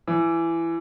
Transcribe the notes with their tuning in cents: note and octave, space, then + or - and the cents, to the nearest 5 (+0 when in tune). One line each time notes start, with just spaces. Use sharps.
E3 +15